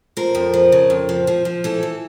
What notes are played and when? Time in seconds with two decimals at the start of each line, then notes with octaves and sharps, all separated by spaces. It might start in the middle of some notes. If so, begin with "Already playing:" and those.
0.17 F3 A#4
0.35 F2
0.54 F3
0.72 C#3
0.90 F2
1.09 F3
1.27 F3
1.45 F3
1.64 E3 A4
1.83 E3